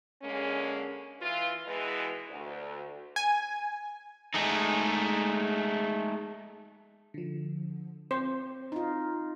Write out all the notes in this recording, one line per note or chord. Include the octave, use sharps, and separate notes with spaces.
D3 G#3 A#3 C#4
E3 F4
B2 E3 G#3 B4 D#5
D2
G#5
G#3 A3 D#4
D3 F3
C4 C5
D#4 F4